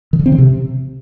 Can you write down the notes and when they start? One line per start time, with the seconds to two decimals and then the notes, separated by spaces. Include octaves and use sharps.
0.13 D#3
0.19 D3
0.26 C4
0.32 D#3
0.38 C3